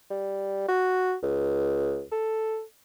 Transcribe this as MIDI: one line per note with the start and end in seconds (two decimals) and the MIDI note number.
0.10 0.68 55
0.68 1.14 66
1.23 2.02 37
2.12 2.62 69